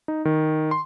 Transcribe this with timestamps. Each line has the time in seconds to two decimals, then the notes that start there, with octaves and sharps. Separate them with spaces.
0.08 D#4
0.25 D#3
0.71 C6